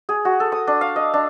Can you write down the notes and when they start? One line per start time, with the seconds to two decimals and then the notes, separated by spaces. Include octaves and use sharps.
0.09 G#4
0.25 F#4
0.40 A4
0.52 D#6
0.67 D4
0.81 F5
0.96 D#5
1.14 D4